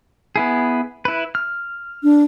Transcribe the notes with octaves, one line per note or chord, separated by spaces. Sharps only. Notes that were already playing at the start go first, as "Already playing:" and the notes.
B3 E4 G#4
E4 B4
F6
D4